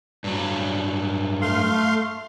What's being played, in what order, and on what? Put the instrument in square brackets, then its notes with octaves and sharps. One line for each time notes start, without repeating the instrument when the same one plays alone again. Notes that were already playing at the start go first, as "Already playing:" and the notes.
[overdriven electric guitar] G2 F#3
[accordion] A3 F5 C6